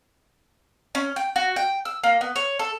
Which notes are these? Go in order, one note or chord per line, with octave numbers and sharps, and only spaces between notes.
C#4
G5
F#4
G5
E6
A#3
B3
C#5
A4